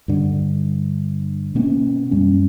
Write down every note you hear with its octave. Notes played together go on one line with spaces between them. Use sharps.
G2 D3
B2 A#3 B3 C#4
F#2 G3 C#4